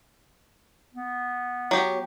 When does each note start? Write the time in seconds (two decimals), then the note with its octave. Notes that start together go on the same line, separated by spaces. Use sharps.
0.94 B3
1.71 F#3 G4